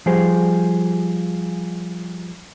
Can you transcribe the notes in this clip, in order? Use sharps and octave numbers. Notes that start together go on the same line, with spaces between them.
F3 G3 G#4 C5